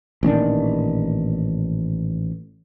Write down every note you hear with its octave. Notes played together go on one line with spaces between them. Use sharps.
A1 A#2 D#3 D4